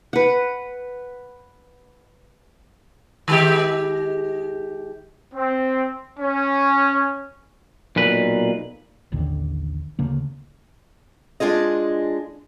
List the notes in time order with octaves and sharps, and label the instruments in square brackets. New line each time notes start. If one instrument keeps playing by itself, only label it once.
[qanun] B4 F#5
[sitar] D#3 G#3 G4
[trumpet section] C4
C#4
[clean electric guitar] B1 A#2 B4
[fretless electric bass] A1 D#2 D3
D2 C#3 A#3
[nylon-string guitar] G#3 D4 F4 G#4 D#5